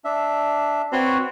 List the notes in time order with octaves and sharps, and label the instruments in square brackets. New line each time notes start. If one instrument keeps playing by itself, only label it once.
[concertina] D4 E5
[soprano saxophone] C4 [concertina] F#4 B4 C#5